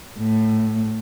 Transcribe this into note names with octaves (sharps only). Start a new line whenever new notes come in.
A2